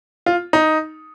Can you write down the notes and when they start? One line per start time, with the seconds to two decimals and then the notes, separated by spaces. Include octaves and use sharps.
0.26 F4
0.53 D#4